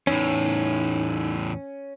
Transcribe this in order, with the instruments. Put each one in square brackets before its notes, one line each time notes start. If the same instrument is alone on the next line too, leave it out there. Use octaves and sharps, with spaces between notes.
[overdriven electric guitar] E2 A2 [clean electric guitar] C#4 [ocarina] D#4